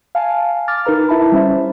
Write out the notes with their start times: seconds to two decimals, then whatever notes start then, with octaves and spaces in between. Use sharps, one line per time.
0.15 F5 G#5 A5
0.68 D6 F6 A6
0.86 D#4 A#4 B4 A#5
1.08 E4 E5 A5 B5
1.32 G3 C#4 C5 E5